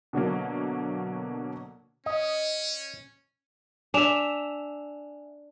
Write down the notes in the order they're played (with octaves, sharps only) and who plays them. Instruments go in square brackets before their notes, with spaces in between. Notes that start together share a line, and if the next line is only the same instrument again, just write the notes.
[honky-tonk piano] B2 D3 F#3 A#3
[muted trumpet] C#4 [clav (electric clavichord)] D#5
[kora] D4 E5 [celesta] G#5 E7 F7